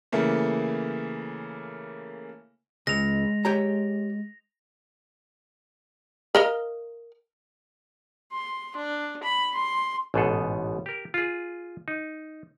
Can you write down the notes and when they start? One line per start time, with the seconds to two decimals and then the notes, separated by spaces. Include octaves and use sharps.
0.12 C#3 E3 A3 A#3
2.87 C#2 G#3 A#6 F7
3.45 G4 C#5 A#5
6.35 A#4 D#5 F5
8.32 C6
8.76 D4
9.23 B5
9.54 C6
10.14 A1 G#2 B2 B3 G#4 A4
10.86 G4 A#4
11.14 F4 G#4
11.88 D#4